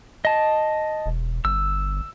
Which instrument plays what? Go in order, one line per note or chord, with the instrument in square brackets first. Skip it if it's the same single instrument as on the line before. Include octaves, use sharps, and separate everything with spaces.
[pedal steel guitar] D#5 A5
[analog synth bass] E1
[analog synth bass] G1 [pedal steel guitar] E6